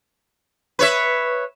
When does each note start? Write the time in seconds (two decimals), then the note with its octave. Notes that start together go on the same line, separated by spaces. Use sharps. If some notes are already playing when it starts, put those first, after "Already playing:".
0.79 B4 C#5 E5